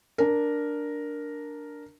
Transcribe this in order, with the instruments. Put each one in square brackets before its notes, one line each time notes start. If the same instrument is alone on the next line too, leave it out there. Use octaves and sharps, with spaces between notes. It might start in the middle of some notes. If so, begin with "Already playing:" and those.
[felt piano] D4 A#4